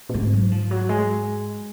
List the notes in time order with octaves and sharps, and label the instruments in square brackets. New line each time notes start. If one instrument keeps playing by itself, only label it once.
[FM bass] A#2
[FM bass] G#2 [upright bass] C4
[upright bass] F#3
F3
F#3
G#3